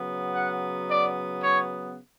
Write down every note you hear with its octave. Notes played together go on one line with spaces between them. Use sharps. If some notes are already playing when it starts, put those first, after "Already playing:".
Already playing: C#3 F#3 B3
F#5
D5
C#5